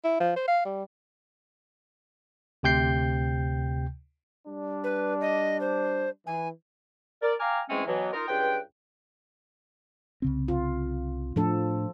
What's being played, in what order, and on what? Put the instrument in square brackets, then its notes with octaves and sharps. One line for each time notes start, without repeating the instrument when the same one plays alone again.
[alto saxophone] E4
F3
C5
F5
G3
[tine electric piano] D2 C3 G5 G6 C7
[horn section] G3 D4
[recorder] B4
D#5
C5
[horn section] E3 [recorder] G#5
[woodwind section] A#4 D5
F5 G5 G#5 A#5 D6 F6
G#2 E3 G#3 A3 C4 C#4
B2 E3 F#3
D#4 F4 A#4
C#2 G2 F4 B4 G5
[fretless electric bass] C2 C#3 C4
[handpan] F4
[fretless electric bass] A2 A3 D4 [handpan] F3 A4